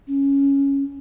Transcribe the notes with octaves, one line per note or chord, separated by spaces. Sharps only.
C#4